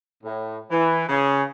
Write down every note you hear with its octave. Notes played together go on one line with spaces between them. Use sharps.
A2
E3
C#3